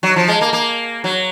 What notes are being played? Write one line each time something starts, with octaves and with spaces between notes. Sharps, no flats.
F#3
F3
G#3
A#3
A#3
F#3